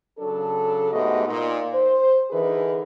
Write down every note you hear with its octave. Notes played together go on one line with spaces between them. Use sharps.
C#3 F#3 D4 A4
G#2 A3 B3 F#4 G4 D#5
A#2 D#4
C5
D3 E3 D#4 G#4 A#4 B4